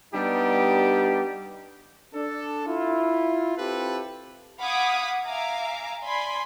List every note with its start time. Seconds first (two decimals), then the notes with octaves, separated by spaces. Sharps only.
0.14 G3 B3 D4 D#4 G4
2.14 D4 A4
2.66 E4 F4
3.56 C4 E4 F4 G4 A4 B4
4.59 F5 F#5 B5 D6 D#6 G#6
5.25 E5 F5 G#5 A#5 D6
6.03 D5 G#5 B5 C6